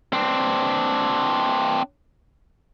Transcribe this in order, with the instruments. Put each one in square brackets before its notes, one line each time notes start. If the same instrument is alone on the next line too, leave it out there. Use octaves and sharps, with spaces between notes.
[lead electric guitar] C4 D4